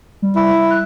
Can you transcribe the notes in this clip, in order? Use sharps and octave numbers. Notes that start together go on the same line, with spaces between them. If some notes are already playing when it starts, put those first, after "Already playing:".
G3
E4
F#6